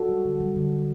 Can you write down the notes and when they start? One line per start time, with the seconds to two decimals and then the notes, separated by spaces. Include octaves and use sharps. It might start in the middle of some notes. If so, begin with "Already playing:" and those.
Already playing: F#4 A4
0.09 G3
0.25 D3
0.40 G3
0.56 D3
0.72 G3